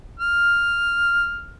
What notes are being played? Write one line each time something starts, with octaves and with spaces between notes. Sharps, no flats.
F6